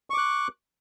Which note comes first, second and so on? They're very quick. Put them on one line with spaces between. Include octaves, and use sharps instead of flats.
C#6 D6 F#6